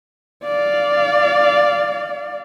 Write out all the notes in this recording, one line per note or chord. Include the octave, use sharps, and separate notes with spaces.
D5 F5